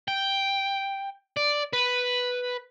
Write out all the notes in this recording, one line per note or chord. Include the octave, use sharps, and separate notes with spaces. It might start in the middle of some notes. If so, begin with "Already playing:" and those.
G5
D5
B4